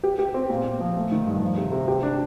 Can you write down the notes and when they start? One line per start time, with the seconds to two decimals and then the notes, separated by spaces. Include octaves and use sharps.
0.03 G4
0.19 G4
0.34 C4
0.50 A#2
0.65 A#2
0.80 F3
0.96 A3
1.12 D#3
1.27 G2
1.42 F3
1.57 C3
1.72 C3
1.88 G4
2.03 D4